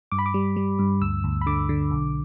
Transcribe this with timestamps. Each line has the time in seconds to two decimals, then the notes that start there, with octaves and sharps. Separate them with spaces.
0.12 G2 D6
0.19 B5
0.26 D6
0.34 G3
0.56 G3
0.79 G2
1.02 D2 E6
1.24 D2
1.41 B5
1.47 D3 D6
1.69 D3
1.91 B1